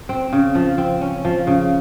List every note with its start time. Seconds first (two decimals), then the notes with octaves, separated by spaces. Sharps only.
0.09 C4
0.33 C#3
0.55 F3
0.78 C4
1.01 C#4
1.25 F3
1.47 C#3